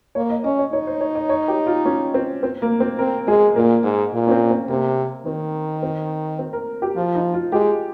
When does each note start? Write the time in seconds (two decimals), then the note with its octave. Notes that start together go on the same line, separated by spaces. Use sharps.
0.15 A#3 C#5
0.30 D#5
0.44 C#4 D#5
0.59 C#5
0.73 D#4 C#5
0.87 C5
1.01 C#5
1.15 D#5
1.29 C#5
1.48 G4
1.67 F4
1.85 C#4
2.14 C4
2.43 C4
2.62 A#3
2.80 C4
2.99 C4 A#4
3.27 G#3 G#4
3.56 A#2 A#3
3.84 G#2
4.13 A#2
4.27 C#4
4.31 C4
4.51 C4
4.69 C3 A#3
5.26 D#3 C4
5.82 C4
6.39 C4
6.53 A#4
6.82 G4
6.96 F3 F4
7.15 D#4
7.34 F4
7.52 G#3 G4